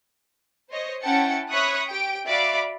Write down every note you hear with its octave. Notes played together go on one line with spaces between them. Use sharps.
C5 C#5 D#5
C#4 E4 F#5 G5 A5 C#7
C#5 E5 B5 C#6 D#6 F#6
G4 G5 D7
F#4 D5 E5 F5 B5 D6